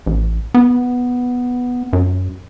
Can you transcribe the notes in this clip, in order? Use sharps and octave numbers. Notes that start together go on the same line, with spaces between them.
A1
B3
F#2